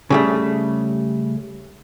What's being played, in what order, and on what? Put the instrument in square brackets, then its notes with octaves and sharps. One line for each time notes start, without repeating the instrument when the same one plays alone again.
[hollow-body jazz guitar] C#3 G3 A3